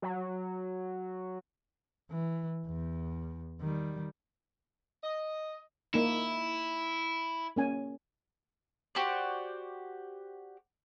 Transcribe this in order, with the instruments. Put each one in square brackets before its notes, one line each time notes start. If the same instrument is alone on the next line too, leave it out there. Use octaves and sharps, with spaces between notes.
[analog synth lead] F#3
[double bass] E3
E2
D#3 G3
[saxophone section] D#5
[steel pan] A#3 D#4 [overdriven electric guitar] E4
[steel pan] A#3 C#4 G#5
[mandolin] F#4 G4 C5 D5